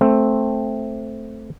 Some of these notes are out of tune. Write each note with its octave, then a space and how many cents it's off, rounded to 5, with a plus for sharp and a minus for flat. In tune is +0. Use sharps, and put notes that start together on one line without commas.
A3 +0 C4 +5